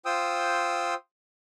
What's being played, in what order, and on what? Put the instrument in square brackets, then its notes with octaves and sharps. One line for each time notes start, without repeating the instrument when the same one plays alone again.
[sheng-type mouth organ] F4 C5 G5 D#6 E6